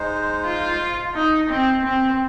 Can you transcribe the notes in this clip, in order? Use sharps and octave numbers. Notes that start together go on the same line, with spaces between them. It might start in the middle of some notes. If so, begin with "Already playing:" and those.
Already playing: G#3 D#4 C5
F4
D#4
C4
C4